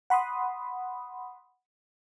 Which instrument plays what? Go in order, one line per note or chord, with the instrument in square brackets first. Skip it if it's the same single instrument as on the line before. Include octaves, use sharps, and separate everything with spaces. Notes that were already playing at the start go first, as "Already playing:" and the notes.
[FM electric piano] F#5 B5 C6 D#6